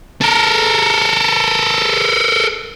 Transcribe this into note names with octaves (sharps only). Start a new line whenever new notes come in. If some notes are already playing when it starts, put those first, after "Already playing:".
A4 A#4